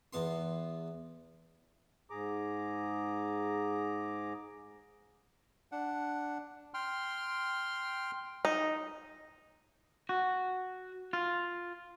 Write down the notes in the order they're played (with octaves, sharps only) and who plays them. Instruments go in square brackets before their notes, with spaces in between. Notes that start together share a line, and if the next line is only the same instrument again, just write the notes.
[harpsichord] E2 B3 C6
[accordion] G#2 G#4 A#5 D6
[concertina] D4 F#5
G5 C6 F6
[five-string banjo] D#4
[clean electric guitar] F#4
F4